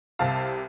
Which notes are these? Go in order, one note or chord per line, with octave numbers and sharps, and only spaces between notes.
C2 C3 G3 F5 A5